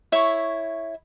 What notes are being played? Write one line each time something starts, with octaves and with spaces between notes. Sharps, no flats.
E4 C#5 E5 C#6